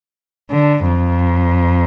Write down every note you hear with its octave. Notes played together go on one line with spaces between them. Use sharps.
D3
F2